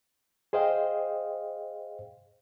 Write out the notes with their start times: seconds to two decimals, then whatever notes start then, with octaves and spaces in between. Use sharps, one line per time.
0.53 G#4 C5 D#5 F5 G5